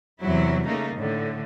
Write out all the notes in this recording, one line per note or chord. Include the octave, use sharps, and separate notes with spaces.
E2 C3 F#3 E4
C#3 A3 A#3 D#4
A2 D3